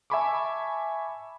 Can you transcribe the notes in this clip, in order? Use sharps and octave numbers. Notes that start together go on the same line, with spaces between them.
E5 G#5 A5 B5 C#6 D6